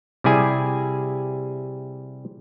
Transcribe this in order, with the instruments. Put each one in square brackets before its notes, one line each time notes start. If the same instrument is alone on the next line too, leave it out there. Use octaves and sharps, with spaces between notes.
[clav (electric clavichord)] C3 G3 E4 G#4 G#5